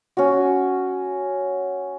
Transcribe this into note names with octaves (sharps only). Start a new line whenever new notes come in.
C#4 F#4